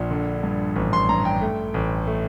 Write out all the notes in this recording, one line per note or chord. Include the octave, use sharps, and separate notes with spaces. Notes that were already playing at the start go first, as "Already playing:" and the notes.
Already playing: A#1 A#2
D3
G2
A1
C6
G2 A#5
G5
A3
A1
A3